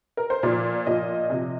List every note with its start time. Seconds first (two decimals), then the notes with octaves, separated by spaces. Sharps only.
0.17 A#4
0.30 C5
0.43 A#2 F3 D5
0.87 A#2 F3 D#5
1.30 C3 F3